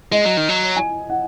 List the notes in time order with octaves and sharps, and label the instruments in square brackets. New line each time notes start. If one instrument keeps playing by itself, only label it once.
[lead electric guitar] G#3 [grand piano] D#5
[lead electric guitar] F#3
D#3
F#3
[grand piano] G#5
F#5